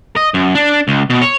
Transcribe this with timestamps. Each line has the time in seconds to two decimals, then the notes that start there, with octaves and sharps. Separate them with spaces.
0.16 D#5
0.34 F#2
0.55 D4
0.88 C#2
1.10 B2
1.21 C#5